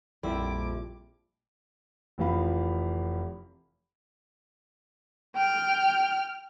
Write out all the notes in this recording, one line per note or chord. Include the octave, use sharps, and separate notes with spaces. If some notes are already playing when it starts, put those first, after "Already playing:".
A#1 F2 G3 E4 D6
F1 E3 F3 F5 B5
G5 F6